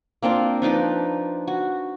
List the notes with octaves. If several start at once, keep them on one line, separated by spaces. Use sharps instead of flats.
A#3 C4 D4 F4
F3 D4 D#4 B4
F#4